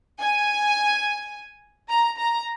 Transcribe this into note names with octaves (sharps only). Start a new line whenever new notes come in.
G#5
A#5
A#5